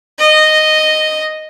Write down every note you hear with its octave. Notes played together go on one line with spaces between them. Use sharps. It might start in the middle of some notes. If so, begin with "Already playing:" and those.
D#5